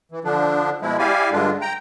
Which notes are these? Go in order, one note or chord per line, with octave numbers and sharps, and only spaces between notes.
E3
D3 F3 D4
B2 F3 G#3 E4
E4 G4 D5 F5 G#5
G2 D3 G#3 D4 F4
G5 A#5